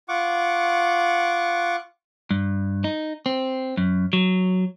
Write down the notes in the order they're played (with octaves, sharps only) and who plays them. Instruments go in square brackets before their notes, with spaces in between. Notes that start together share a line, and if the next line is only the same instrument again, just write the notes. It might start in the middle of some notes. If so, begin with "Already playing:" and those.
[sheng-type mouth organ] F4 F#5 C#6 D6
[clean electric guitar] G2
D#4
C4
F#2
F#3